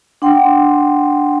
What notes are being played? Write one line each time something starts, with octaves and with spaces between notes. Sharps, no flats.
D4 F#5 G5 C6